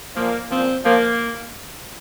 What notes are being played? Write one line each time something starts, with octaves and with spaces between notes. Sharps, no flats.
A#2 F3 A#3
A#2 F3 C4
A#2 F3 A#3